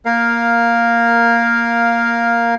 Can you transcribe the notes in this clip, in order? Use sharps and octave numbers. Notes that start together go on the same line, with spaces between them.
A#3 A#4 F5